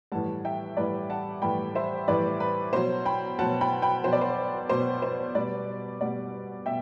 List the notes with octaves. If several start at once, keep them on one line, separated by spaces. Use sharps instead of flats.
A2 E3 G3 F#5 A5
E5 G5
A2 E3 G3 B4 D5
F#5 A5
A2 E3 G3 G5 B5
C5 E5
A2 E3 G3 B4 D5
B4
B2 F#3 C5
G5 B5
B2 F#3 F#5 A5
G5 B5
G5 B5
B2 F#3 C5
D5
C5
B2 F#3 C5
C5
B2 G3 B4 D5
B2 G3 D5 F#5
B2 E5 G5